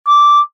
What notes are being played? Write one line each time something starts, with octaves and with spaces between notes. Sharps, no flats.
D6